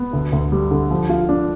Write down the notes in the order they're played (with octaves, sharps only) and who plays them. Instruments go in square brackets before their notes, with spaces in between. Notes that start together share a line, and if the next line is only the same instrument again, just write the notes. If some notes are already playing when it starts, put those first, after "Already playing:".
Already playing: [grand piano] B3
D2
D2
G3
D3
F3
F4
D4